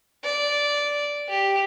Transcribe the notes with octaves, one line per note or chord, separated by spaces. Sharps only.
D5
G4